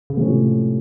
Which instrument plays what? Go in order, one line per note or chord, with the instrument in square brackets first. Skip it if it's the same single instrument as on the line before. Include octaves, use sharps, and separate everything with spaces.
[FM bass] C#3
[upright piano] A2 F3 G#3 C#4 [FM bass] C3